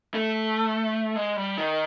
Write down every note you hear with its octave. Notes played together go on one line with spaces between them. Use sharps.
A3
G#3
G3
D#3